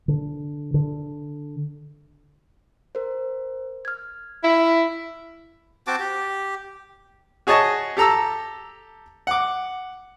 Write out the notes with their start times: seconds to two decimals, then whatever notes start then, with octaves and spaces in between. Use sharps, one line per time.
0.08 D3
0.74 D3
2.95 A#4 C5
3.85 F6 G#6
4.43 E4
5.87 C4 F#4 A5 D6
6.00 G4
7.47 F#4 G#4 C#5 D#5 A5
7.97 G4 A4 A#5 E6
9.27 F#5 D6